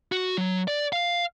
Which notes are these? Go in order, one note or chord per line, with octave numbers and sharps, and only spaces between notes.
F#4
F#3
D5
F5